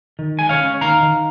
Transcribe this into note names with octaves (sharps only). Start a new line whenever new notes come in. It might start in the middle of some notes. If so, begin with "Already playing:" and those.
D#3
G#3 G#5
C#5 F5
C#4
D#3 F5 A#5
D#3